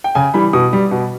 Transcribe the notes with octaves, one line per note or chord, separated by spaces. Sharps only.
G5
C#3 G#5
E3 G3 B5
B2 D#6
G3
B2